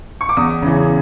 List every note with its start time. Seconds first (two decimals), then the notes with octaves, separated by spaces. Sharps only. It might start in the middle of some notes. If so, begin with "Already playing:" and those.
0.21 C#6
0.29 D6
0.37 E2 D#6
0.62 C#3 E3